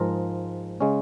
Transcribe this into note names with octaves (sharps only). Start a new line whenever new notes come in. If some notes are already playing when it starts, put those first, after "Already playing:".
Already playing: G#2 F3 G#3 F4 A#4
C#3 G#3 C#4